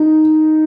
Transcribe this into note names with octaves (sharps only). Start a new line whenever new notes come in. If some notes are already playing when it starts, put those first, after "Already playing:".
Already playing: D#4